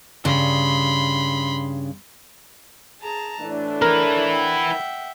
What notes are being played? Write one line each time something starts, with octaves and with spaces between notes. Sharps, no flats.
G2 C#3 B5 C6
G#4 A5 A#5
A2 E3 A3 D4
E4 A#4 B4
E5 F#5 G5